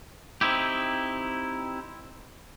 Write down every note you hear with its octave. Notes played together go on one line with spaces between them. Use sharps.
C4 D#4 E4 G4